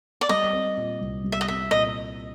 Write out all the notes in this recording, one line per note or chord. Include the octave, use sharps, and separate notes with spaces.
D5
G3 D#5
C4
A#2
C2
G3
E5
D#5
C4 E5
A#2 D#5